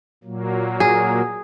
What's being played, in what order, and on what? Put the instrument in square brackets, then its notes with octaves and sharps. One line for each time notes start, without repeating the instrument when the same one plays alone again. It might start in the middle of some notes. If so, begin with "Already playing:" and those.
[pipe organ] A#2 F#3 A#3
[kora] G#4